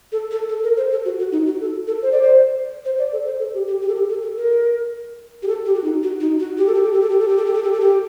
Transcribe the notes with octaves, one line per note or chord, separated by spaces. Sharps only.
A4
A4
A4
A#4
C5
A4
F#4
F#4
D#4
F#4
A4
A4
C5
D5
C5
C5
D5
A4
C5
A4
G4
G4
G4
A4
G4
A4
A4
A#4
G4
A4
G4
F#4
D#4
F#4
D#4
F#4
G4
A4
G4
A4
G4
A4
G4
A4
G4
A4
G4
A4
G4
A4
G4